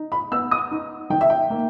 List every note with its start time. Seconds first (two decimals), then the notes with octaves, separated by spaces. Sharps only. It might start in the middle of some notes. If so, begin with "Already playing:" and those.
Already playing: D#4
0.12 B5
0.32 B3 E6
0.51 D#6
0.71 D#4
1.10 D#3 G5
1.21 E5
1.30 G5
1.50 A#3